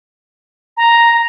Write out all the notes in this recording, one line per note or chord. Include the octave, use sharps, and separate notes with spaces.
A#5